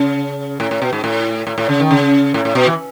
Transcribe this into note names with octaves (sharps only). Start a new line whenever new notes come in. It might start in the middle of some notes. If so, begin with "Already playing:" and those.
Already playing: C#3
A2
A2
B2
G#2
A2
A2
A2
C#3
D#3
C#3
A2
A2
B2
E3